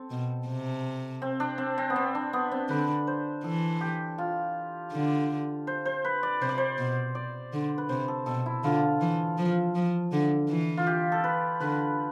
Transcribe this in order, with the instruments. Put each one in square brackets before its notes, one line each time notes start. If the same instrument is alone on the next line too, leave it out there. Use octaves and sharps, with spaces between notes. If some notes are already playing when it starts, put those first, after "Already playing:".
Already playing: [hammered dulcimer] C4 A4
[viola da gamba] B2
C3
[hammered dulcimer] C4
D4
C4
C4
B3
C4
D4
B3
C4
[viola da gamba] D3 [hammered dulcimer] B4
[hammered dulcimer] C5
[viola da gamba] E3 [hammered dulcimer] A4
[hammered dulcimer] G4
F4
[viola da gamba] D3
[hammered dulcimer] C5
C5
B4
D5
[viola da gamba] C3 [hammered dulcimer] C5
[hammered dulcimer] D5
C5
[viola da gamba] B2
[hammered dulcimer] D5
[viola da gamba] D3
[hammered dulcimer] B4
[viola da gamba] C3 [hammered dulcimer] C5
[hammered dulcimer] A4
[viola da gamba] B2 [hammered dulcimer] A4
[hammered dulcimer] E4
[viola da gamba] D3 [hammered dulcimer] F4
[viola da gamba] E3
F3
F3
D3
E3
[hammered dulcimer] F4
G4
A4
B4
[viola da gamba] D3 [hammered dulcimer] B4